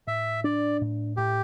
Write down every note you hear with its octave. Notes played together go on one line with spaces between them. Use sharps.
A2 E5
D4 D5
A2
A2 G4